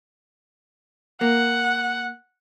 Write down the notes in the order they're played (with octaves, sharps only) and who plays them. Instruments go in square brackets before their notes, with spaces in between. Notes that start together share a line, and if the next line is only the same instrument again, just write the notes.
[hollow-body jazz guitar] A#3 [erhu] F#5